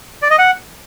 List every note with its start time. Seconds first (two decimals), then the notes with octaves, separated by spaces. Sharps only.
0.22 D5
0.31 D#5
0.39 F#5